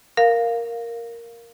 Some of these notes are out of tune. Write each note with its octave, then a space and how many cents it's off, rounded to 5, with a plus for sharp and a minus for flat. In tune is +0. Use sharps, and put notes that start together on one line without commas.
A#4 +0 F5 +0